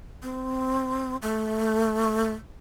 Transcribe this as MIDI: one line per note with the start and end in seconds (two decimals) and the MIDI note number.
0.23 1.17 60
1.22 2.32 57